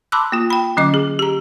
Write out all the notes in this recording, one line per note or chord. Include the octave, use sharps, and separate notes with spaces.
A5 B5 C6 D6 E6 F#6
A#3 F4
G5 B5
D3 F#3 C#4 D#5 D6
G#4
G4 A#5